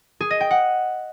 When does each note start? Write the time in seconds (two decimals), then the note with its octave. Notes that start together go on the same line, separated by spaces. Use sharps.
0.20 G#4
0.30 D#5
0.41 G5
0.51 F#5